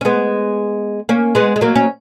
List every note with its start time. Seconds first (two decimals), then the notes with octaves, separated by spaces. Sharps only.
0.01 C#4
0.05 G#3 B3
1.09 A#3 C#4
1.35 G#3 B3
1.56 G#3
1.61 F#3 A#3
1.76 C#4